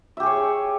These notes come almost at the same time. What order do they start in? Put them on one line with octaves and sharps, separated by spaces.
E5 G4 G#4 C#5